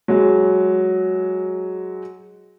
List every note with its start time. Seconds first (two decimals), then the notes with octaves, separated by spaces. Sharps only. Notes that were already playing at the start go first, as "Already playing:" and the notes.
0.08 F#3 G#3